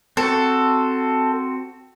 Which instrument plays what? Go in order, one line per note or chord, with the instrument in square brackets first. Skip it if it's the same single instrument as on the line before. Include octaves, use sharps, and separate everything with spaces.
[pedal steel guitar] C4 F#4 [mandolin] A4